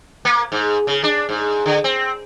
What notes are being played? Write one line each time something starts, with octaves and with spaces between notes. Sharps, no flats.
A#3
G#2
C#3
D4
G#2
D3
C4